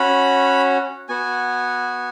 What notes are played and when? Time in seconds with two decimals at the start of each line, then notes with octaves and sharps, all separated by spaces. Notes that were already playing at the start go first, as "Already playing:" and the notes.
Already playing: C#4 F#4 B5
1.09 B3 F#4 G#5